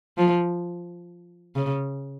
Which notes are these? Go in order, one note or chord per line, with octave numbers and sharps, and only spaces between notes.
F3
C#3